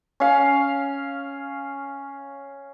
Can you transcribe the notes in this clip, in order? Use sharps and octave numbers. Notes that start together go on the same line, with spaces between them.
C#4 F5